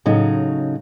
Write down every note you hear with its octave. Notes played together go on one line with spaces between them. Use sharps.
A2 C#3 F#3 D#4